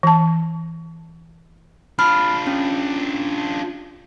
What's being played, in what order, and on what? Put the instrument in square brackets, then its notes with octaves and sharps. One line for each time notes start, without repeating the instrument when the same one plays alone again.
[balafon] E3 A5
[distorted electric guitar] D4 F4 [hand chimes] B5 F6
[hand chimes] C#4